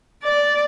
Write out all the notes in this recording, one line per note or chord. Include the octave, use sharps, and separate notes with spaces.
D5